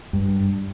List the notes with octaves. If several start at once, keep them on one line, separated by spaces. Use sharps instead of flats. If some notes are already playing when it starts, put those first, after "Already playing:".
G2